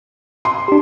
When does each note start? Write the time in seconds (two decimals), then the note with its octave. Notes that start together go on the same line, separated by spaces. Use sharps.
0.45 C6
0.68 D4 G4